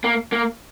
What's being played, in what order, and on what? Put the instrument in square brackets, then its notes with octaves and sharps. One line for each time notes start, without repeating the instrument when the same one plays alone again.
[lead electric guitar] A#3
A#3